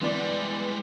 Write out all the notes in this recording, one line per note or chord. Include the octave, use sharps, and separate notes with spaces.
E3 G3 G#3 B3 D5